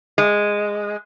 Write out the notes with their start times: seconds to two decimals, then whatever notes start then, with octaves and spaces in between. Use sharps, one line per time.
0.18 G#3